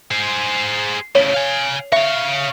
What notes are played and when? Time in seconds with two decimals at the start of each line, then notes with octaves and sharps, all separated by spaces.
0.11 G#4 C5
1.15 A2 C#3 C#5
1.34 F5 G#5
1.92 C#5 E5 F5